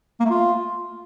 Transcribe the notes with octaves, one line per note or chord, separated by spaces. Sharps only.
A#3
A3
F4